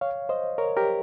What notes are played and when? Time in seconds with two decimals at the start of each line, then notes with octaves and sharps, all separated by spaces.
0.01 C#5 F5
0.29 C5 D#5
0.58 A#4 C#5
0.77 G4 A#4